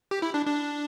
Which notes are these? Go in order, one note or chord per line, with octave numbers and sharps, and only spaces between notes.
G4
E4
D4
D4